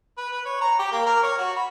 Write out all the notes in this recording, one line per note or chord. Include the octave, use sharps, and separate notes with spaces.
B4
B4
C#5
A#5
G4
A#3
A#4
C#5
F#4
B5